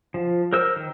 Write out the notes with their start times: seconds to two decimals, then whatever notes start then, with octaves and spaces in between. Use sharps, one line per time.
0.14 F3
0.53 A#4 C5 E6
0.76 D#3